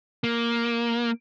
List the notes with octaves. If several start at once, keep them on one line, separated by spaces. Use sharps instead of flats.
A#3